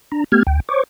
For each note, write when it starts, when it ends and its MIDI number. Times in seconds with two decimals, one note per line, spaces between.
0.12 0.24 62
0.12 0.24 82
0.32 0.43 57
0.32 0.43 59
0.32 0.43 67
0.32 0.43 89
0.32 0.43 92
0.47 0.60 38
0.47 0.60 79
0.69 0.83 72
0.69 0.83 73
0.69 0.83 85
0.69 0.83 86